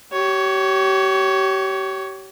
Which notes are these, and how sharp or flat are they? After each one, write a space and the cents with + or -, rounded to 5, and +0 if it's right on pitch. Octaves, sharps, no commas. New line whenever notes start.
G4 -35 C#5 +10